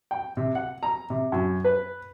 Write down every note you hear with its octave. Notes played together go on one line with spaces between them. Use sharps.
G5
C3
F#5
A#5
C3
F#2
B4